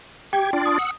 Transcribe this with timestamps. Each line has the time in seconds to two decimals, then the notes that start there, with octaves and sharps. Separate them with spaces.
0.33 G4 G5 G#6
0.53 D4 F4 D5
0.65 D#6
0.79 F#5 E6